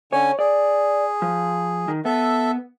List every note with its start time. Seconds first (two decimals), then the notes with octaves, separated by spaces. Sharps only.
0.13 D3 C#4 C#5 G#5
0.39 G#4 D5
1.22 F3
1.88 D#3
2.05 B3 A4 E5